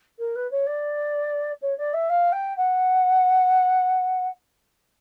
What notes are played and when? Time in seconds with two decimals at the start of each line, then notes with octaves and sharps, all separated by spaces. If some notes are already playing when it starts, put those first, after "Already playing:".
0.19 A#4
0.35 B4
0.51 C#5
0.66 D5
1.62 C#5
1.78 D5
1.93 E5
2.09 F5
2.32 G5
2.57 F#5